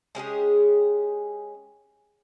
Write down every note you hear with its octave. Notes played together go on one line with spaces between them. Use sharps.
G#3 C#4 G4 G#4